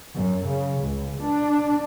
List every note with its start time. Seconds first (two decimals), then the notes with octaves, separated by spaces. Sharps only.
0.15 F#2
0.46 C#3
0.82 C#2
1.20 D4